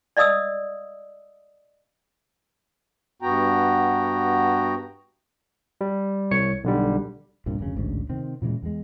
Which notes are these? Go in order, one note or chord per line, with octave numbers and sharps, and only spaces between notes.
D5 D#5 F5 D#6 E6
G2 B3 F#4 G5 A#5
G3
C2 C#5 C#7
B1 D3 G3
C2 G2 A#2
F1 D2 G#2 C#3
A1 D2 G#2 C#3
C3 D#3 C4
A#2 C#3 E3 G#3
E2 G#3